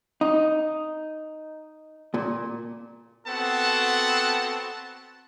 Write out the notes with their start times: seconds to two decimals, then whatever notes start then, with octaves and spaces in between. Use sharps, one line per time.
0.21 D#4
2.14 A#2
3.27 B3 C4 F#4 A4 F#5 A5